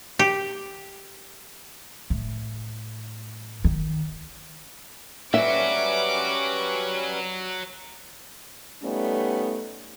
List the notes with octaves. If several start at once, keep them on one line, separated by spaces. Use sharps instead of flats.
G4
A2
D#3
F#3 G3 C#4 F#4 B4 E5 D6
G3 A3 B3 C#4 D#4